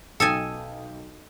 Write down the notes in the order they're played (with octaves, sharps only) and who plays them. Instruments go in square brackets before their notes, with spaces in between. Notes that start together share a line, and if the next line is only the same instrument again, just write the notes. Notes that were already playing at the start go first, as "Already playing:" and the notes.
[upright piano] B1 G5 [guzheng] A4 D#5 G#5